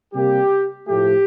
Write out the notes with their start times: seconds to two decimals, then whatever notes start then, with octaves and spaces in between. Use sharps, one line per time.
0.13 C3 G3 A#3 G4
0.87 A2 F3 A3 G4